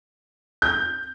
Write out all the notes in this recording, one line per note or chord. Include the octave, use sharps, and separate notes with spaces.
G6